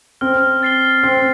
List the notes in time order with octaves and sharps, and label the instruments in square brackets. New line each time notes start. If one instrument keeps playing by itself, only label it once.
[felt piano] C4 [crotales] F6
[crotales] A6 C7 G7
[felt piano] C4 [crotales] F6